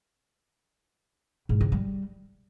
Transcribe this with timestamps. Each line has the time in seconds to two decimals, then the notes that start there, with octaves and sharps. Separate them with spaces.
1.49 G#2
1.61 C#3
1.72 G3